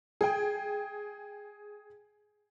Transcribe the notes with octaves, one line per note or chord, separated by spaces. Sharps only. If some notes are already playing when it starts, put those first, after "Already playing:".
G#4 G5